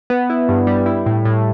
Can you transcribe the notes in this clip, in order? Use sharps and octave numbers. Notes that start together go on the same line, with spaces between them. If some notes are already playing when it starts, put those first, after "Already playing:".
B3
E4
G2
G3
E4
A2
A2